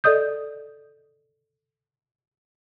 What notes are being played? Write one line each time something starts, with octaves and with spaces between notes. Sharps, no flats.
A4 D5 D#5 D#6 G6